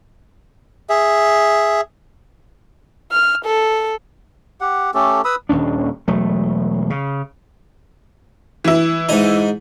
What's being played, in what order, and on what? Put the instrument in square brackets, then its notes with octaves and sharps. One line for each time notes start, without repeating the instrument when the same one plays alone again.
[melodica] G#4 E5
[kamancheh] F6
A4
[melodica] G4 F#5
A3 C#4 G4 A4
B4 B5 D#6 E6
[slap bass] D#1 D#2 C#4 D4
E1 F#3 A3
C#3
[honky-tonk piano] E3 E4
[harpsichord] G#2 D#4